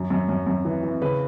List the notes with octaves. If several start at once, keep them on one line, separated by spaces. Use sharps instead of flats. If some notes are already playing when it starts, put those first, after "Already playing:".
Already playing: F#2
F#2
F#2
F#2
E3
E3
C#3 B4